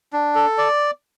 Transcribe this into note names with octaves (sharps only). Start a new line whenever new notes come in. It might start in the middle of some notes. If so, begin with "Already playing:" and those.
D4
A4
D5